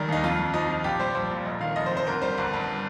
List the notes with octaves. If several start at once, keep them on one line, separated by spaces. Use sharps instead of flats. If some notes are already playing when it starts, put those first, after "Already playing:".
Already playing: F1 D#3 G3 A#4
D#2 D#4
F2 F4
F2
F3 D#4
F3
A#1 G4
G3 C5
A#1 C5
A#2
F1 D#5
D#3 F5
F1 D#5
C5
F2
C5
G1 A#4
G3 C5
G1
G2